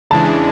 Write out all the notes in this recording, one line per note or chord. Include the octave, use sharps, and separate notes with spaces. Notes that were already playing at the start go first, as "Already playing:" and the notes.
E2 C#3 E3 G#3 D4 A5